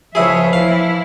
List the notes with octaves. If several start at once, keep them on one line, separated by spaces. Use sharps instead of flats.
C#2 F3 E4 G#4 C#5 E5
E3 E4 F5